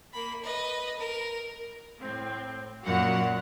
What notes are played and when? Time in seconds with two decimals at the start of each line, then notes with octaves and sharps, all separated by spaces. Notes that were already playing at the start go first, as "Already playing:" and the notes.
0.13 A#3 B5
0.44 B4 D#5
0.99 A#4
2.00 A2 C4
2.84 F#2 A#2 F#4 F5 F#5